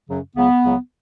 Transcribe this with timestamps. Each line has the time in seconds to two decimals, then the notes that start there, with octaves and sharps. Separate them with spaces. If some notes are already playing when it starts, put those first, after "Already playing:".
0.08 F#2 C#3 F#3
0.36 C#2 C#3 F#3 B3
0.64 C#2 C#3 F#3